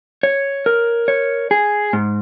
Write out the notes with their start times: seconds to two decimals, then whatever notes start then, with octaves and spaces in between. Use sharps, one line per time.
0.23 C#5
0.66 A#4
1.08 C#5
1.51 G#4
1.93 G#2